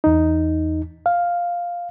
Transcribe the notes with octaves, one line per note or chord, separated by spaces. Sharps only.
E2 D#4
F5